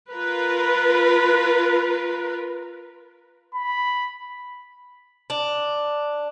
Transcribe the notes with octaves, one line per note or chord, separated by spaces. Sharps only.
F4 A#4 B4
B5
D4